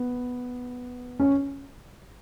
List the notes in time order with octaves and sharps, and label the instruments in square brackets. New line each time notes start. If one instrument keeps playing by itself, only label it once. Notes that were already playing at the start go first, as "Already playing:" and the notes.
Already playing: [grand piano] B3
C#4